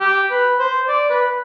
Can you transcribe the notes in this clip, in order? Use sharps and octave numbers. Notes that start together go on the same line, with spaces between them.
G4
B4
C5
D5
B4